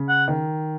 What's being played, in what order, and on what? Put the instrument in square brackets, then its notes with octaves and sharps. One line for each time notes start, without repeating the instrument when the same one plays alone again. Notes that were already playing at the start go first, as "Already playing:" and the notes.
Already playing: [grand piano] C#3
[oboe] F#5
[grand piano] D#3